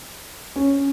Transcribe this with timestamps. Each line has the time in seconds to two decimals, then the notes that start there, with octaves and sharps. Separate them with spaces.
0.56 C#4